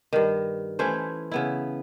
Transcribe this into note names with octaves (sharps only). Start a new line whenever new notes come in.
G2 D#3
E3 A3 C#4 C5
C#3 B3 E4